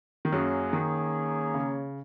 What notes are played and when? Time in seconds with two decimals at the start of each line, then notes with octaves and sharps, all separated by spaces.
0.25 D#3
0.32 F#2 F#3 A#3 C#4 G#4 C#5
0.73 D#3
1.54 C#3